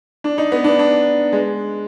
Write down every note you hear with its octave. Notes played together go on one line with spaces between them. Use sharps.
D4
D#4
B3
D4
D4
G#3